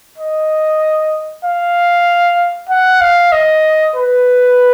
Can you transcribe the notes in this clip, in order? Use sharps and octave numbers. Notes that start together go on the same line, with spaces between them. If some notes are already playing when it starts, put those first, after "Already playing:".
D#5
F5
F#5
F5
D#5
B4